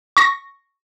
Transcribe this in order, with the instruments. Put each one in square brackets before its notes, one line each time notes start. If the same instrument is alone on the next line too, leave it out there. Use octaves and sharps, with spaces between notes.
[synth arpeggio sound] C#6 A#6